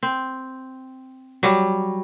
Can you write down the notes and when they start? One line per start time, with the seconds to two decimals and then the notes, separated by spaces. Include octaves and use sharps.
0.03 C4
1.43 F#3 G3